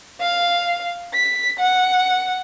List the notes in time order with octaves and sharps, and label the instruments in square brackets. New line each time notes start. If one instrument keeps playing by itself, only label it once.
[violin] F5
B6
F#5